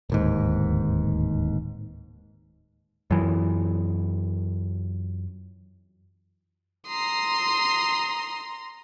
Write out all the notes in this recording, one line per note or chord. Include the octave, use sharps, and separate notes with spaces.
D1 D#2 G#2
F#2 E3
A#5 C6 D#6 C7